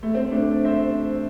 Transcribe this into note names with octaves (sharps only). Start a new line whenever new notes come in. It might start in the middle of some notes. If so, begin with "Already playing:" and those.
A3
C4
A3 D4
C5 E5